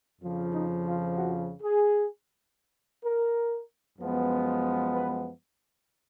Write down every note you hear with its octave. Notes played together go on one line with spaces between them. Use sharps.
F2 C#3 F3
D#4
F4
F#4
G#4
A#4
F#2 F3 G#3 B3
B4